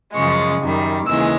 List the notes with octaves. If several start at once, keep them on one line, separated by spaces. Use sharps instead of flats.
F#2 C#3 F3 G#3 C#6
F#2 D#3 G3
D#2 C#3 E3 G#3 E6